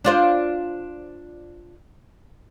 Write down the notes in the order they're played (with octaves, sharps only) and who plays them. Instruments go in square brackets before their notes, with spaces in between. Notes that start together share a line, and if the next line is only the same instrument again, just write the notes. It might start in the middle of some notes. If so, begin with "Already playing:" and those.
[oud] D4 F4 C5